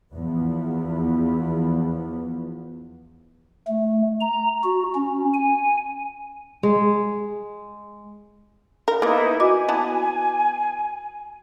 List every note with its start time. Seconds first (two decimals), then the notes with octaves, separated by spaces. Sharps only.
0.13 E2 F3 B3
3.67 A3
4.21 A#5
4.64 F#4
4.95 C#4
5.34 G#5
6.63 G#3
8.88 A#4
9.02 A#3 B3 D#4 E4 B4
9.40 F#4 D#5 G#5 D6
9.69 B3 E4 A5